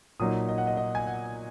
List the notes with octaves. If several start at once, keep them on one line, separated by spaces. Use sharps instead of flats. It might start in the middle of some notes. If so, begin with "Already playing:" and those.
A#2 F#3 A#3 D#4 D#6
D#5
F#5
D#5
D#5
G#5
F#5